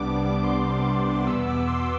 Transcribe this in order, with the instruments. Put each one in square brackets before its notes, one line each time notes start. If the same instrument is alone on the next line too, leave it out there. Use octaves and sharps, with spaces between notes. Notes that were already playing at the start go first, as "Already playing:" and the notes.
Already playing: [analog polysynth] C2 C3 G3 B3 D4 D6
C6
E2 B2 B3 E6
D6
C6